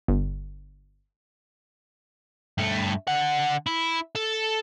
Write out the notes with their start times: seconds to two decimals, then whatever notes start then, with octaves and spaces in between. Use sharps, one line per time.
0.08 G1
2.58 G2 A3
3.08 D3 F#5
3.67 E4
4.16 A4